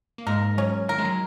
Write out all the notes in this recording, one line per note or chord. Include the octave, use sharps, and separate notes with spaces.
A#3
G#2 G#3 A#4
F#3 C#4
D#3 A#4
G#3
F#3